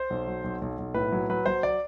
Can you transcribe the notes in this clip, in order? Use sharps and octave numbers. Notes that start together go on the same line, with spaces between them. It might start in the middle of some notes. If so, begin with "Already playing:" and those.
Already playing: C5
B1
F#3
B1
B1
B1
A2 B4
F#3
F#3 B4
F#3 C5
D5